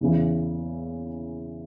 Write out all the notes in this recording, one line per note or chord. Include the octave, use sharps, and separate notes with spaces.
E2 C#3 E3